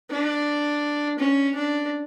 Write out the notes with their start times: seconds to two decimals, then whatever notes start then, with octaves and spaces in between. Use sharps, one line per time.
0.11 D4
1.19 C#4
1.55 D4